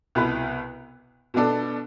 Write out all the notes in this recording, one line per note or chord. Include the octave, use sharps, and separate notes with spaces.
C2 B2 B3 E4 B4
B2 B3 D4 A4